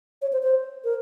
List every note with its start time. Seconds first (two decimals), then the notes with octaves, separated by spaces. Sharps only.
0.22 C#5
0.33 C5
0.43 C5
0.84 A#4